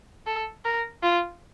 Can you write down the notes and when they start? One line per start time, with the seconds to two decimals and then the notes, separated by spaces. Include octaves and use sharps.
0.27 A4
0.65 A#4
1.03 F4